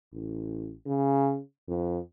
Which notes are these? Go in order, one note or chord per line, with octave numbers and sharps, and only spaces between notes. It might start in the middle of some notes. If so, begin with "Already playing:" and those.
A1
C#3
F2